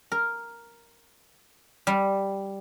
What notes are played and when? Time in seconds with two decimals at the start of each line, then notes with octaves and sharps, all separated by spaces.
0.12 A#4
1.87 G3